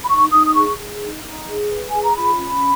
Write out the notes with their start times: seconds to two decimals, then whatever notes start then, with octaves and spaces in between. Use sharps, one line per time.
0.04 B5
0.09 D#4 C#6
0.31 D#4 D#6
0.46 D#6
0.55 G#4 C#6
0.78 G#4
1.00 D#4
1.24 D#4
1.46 G#4
1.70 B4
1.90 G#4 G#5
2.03 A#5
2.16 F4 B5
2.39 C#4